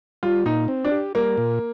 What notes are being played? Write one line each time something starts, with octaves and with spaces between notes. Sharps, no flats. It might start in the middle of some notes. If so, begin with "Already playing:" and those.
G3 F4
A#2 D#4
C4
D4
G4
G3 A#3
A#2